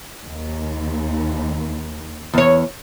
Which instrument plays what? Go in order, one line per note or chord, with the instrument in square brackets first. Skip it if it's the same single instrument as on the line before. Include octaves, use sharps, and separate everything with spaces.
[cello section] D#2
[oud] E2 C#5